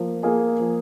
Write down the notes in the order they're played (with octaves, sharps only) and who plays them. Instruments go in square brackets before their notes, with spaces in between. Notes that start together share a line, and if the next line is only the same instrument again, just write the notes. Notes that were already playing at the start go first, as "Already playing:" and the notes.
Already playing: [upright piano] F3 A#3
A#3 F4 G#4
F3